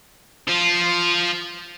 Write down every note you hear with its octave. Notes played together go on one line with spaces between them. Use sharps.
F3 F4